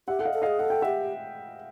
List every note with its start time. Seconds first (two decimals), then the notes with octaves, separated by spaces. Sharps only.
0.08 G4 E5 F#5
0.19 A4 F#5
0.25 D#5 F5
0.34 A4
0.42 G#4 D#5 F5
0.59 A4 F#5
0.70 G5
0.82 G4 E5 F#5